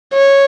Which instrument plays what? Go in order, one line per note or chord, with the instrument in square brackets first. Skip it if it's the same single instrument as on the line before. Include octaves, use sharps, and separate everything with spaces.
[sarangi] C#5